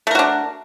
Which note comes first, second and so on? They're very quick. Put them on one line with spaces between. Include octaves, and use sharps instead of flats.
A3 A#4 F#4 D4